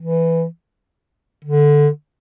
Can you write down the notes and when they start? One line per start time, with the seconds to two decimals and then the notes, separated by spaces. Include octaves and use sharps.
0.01 E3
1.45 D3